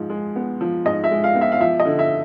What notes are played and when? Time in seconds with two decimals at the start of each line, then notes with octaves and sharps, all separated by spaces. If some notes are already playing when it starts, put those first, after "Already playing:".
Already playing: G#2 F3
0.10 G#3
0.36 B3
0.61 F3
0.85 G#2 D#5
1.04 E5
1.11 G#3
1.24 F5
1.35 B3
1.41 E5
1.52 F5
1.60 F3 E5
1.80 D#5
1.85 D3
1.99 E5